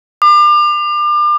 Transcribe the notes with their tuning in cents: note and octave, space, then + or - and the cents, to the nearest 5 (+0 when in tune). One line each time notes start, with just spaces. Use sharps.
D6 +35